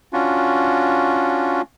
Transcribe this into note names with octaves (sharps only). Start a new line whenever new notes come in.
C#4 D4 F4 F#4